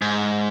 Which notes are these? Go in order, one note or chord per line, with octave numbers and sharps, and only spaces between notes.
G#2